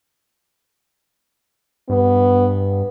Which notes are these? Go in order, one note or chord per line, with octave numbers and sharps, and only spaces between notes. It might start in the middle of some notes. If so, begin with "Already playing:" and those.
G2 B3